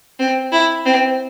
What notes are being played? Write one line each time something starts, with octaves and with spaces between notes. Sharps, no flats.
C4
E4
C4